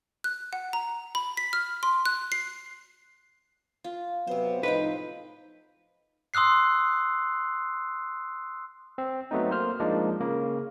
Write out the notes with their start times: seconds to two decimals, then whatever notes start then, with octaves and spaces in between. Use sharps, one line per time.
0.24 F#6
0.53 F#5
0.73 A#5
1.15 B5
1.37 B6
1.53 F6
1.83 C6
2.06 F#6
2.32 C7
3.84 F4
4.27 C3 F#3 B3 C5
4.63 A2 F3 D#4 B4 C5 F5 G5
6.34 C6 D#6 E6 F#6 C7
8.98 C4
9.31 F#3 A3 B3 C4 D#4
9.50 A#3 C5 F6
9.80 F3 G#3 A#3 D4 D#4 D5
10.20 C#3 A#3